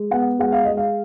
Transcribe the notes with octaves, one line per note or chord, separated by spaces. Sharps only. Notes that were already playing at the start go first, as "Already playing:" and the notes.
Already playing: G#3
B3 F#5
G#3 F#5
F5
G#3 D#5
F5